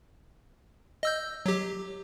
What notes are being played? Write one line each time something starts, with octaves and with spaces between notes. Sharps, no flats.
D#5 E6 G6
F#3 G4